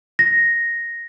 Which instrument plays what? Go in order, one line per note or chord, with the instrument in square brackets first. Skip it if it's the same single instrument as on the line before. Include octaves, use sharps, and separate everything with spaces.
[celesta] A#6